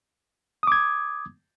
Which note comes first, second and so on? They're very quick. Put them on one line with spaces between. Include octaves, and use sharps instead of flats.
D#6 D6 G#6